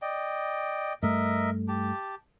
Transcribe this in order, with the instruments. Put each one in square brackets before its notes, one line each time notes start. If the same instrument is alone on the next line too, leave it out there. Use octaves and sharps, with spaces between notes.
[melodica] D5 D#5 G5
[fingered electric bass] G2 A3 [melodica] A#4 D#5 E5
[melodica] G4 A5